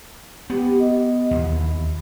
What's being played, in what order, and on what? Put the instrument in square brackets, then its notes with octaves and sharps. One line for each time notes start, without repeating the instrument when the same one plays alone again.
[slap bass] B3 [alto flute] G4
[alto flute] D#5
[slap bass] D#2 [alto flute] E4